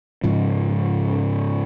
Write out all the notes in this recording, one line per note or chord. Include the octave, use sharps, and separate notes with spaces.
G#2 C#3 F3